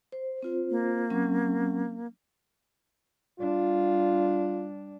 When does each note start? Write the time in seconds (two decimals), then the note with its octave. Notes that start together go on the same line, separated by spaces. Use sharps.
0.12 C5
0.43 C4 F4 C5
0.70 A#3
1.10 F#3 C4 C#4
3.39 G3 D4 F4